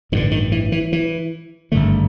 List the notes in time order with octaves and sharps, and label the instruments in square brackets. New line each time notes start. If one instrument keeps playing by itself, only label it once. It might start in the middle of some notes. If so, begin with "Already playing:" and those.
[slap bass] A1 G2 D3 D#3
D#3
E3
E3
E3
G#1 G2 D3 A3